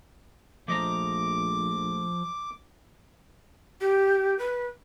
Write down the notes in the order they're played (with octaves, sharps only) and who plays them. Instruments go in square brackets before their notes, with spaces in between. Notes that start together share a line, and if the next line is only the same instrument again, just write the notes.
[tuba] A#1 [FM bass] F3 [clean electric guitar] A3 D#5 A#5 [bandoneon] D6
[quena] G4
B4